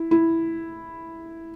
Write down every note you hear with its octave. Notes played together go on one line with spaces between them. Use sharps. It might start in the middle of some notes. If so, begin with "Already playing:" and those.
Already playing: E4
E4